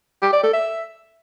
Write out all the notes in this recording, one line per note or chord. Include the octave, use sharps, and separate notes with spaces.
G4
D5
A4
E5